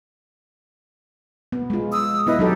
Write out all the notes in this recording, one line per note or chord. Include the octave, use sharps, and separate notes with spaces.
B3
G#3 F4
D#6 E6
B3 E4 B4 D#5
F#3 D#4 G4 A4